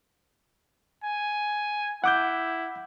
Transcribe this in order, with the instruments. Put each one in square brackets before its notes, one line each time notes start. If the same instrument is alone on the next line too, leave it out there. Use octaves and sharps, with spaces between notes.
[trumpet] G#5
[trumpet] E4 [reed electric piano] F#5 D6 G6